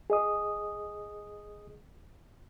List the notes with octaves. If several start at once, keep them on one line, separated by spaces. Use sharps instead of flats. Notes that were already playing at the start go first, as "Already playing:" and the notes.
G#4 D#5 D#6